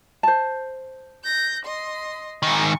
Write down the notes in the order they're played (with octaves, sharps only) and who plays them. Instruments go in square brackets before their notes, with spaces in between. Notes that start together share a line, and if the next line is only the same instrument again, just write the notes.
[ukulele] C5 A5
[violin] G6 A#6
D#5 C6
[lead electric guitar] G#2 D#3 [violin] G#5 C#6